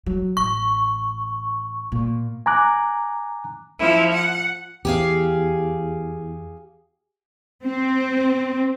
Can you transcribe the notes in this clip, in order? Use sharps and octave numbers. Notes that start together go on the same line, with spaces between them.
F#3
A1 C#6
A#2
G#5 A#5 D6 F#6
F3 E4
F#5
E2 G4 G#4 F5
C4